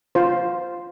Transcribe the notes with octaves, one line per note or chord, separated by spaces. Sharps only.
F4 C5